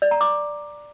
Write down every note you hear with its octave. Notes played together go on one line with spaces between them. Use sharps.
D5
A#5
D6